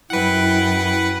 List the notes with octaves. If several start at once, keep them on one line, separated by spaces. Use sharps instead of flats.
F#2 E4 B4 F#5 G5
E4